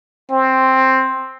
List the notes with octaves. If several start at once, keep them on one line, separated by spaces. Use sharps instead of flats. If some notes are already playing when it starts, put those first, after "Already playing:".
C4